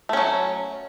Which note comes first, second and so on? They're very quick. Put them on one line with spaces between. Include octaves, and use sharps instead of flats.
A3 C#4 F#3